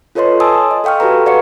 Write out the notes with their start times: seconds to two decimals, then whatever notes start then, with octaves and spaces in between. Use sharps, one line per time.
0.15 F4 A4 B4 C#5 D#5 C6
0.40 G#5 A5 C6 D#6 E6
0.71 D#5
0.84 A4 F5 G5 C#6 F6
1.00 F#4 G4 A4 B4 A#5
1.26 B4 D5 F5 F#5 C#6 C#7